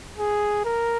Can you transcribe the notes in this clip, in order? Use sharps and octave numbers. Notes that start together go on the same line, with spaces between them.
G#4
A#4